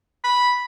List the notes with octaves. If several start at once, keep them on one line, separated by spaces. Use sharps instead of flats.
B5